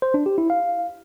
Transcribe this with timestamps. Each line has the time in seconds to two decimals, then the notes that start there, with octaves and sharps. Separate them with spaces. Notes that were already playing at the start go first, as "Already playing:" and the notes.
0.02 C5
0.14 D4
0.26 G4
0.38 E4
0.50 F5